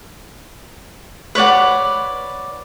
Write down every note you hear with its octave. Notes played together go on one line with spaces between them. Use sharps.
B4 C#5 D5 F#5